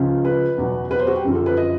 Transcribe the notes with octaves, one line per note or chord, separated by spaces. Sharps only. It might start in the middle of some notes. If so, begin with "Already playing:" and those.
Already playing: C#2 C#3 F3
B4
E2 B2 F#3
B4
C5
F#4
G4
F#2 D3 F3
A4
B4
D#5